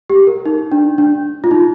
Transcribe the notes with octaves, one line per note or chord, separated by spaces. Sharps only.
G4
A#4
D#4
D4
D4
F4
D#4